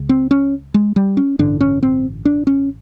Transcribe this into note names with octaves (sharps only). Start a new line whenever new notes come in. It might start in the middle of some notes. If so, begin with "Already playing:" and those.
Already playing: C#2 C#3
C4
C#4
G#3
G3
C#4
A1 G2 D3 D4
C#4
C4
D4
C#4